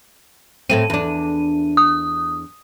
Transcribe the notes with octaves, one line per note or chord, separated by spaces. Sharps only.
A2 A3 C4 D#7
E2 D4
D#6